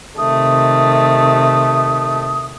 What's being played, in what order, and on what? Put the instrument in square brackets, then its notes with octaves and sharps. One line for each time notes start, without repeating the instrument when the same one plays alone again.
[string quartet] C3 D#3 A3 [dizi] D#6